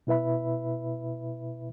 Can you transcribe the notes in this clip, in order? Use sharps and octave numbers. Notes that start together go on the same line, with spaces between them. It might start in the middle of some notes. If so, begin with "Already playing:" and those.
B2 E4 B4 E5 B5